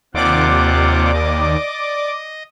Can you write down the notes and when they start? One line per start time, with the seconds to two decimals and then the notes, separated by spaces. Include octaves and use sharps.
0.14 D#2 C3 F4 D5 F#5 D6
1.14 D#5